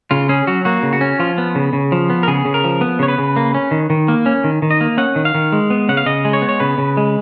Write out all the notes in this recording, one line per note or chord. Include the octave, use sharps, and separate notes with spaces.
C#3 F4
C#4 G#4
F#3 F#4
A#3 F#4
C#3
F#4
C#4
F3 F4
B3
C#3
C#3
F3
B3
A#4
C#3 G#4
C#3
A#4
F3
B3
C#3 C#5
B4
C#3
A#3
C#4
D#3
D#3
A#3
C#4
D#3
D#3
D#5
A#3
C#4 F#5
D#3
F5
D#3
G#3
B3
C#3 F#5
F5
C#3 D#5
G#3
C#5
B3
C#5
C#3 B4
C#3
G#3